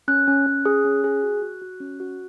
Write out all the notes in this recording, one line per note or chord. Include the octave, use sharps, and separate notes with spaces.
C#4 F#6
C#4
C#4
G#4
C#4
G#4
F#4
F#4
F#4
C#4
F#4